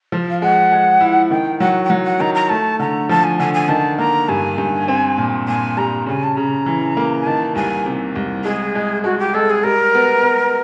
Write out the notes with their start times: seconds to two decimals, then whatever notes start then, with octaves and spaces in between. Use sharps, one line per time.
0.12 F3
0.30 F5
0.42 G#3 F#5
0.72 G#3
1.00 E4
1.31 D#3 G5
1.60 F#3 F#5
1.84 G5
1.90 F#3 F#5
2.04 F#5
2.20 D#3 A#5
2.35 A#5
2.49 A3 A5
2.79 D3 A#5
3.09 F3 A5
3.24 G#5
3.39 D3 G#5
3.54 G#5
3.68 D#3 A5
3.98 A#3 A#5
4.29 G2 G#5
4.58 G2
4.88 C4
5.18 A#2
5.48 A#2 G#5
5.77 G3 A#5
6.06 C#3 G#5
6.23 A5
6.36 C#3 A#5
6.66 E3
6.97 A#3
7.21 G#5
7.27 D#3 A5
7.55 C2 G#5
7.86 C3
8.16 C2
8.44 G#3 G#4
8.75 G#3
9.04 G#3 F#4
9.19 G4
9.34 G#3 A4
9.50 G#4
9.64 G3 A#4
9.94 B3
10.23 B3